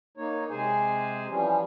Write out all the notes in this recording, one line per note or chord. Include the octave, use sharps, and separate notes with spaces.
A#3 D#4 C#5
C3 G#3 G#4 C5 G#5
E3 F3 G3 C#4